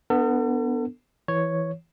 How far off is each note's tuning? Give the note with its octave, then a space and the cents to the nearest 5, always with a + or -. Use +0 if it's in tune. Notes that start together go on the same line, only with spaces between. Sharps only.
B3 +0 D4 +0 A4 +40
E3 +0 C#5 +0